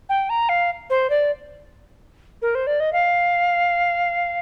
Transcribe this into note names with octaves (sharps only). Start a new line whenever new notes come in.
G5
A#5
F5
C5
D5
A#4
C5
D5
D#5
F5